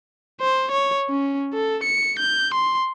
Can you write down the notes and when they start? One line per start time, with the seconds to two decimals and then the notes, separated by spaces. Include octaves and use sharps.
0.41 C5
0.72 C#5
1.10 C#4
1.53 A4
1.84 C#7
2.19 G6
2.54 C6